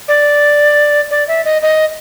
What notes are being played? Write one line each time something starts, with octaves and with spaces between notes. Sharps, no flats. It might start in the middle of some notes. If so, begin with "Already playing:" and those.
D5
D5
E5
D#5
D#5